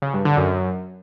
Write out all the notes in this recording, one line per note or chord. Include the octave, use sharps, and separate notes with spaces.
C#3
G2
D3
F#2